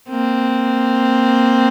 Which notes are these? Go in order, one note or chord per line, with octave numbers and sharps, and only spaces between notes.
A#3 C4